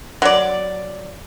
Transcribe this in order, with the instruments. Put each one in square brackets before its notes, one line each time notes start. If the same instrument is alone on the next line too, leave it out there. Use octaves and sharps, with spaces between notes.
[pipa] F#3 D5